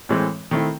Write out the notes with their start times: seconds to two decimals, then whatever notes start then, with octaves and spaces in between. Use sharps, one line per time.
0.09 A2 E3 G#3 C4
0.51 D#3 A3 C4 E4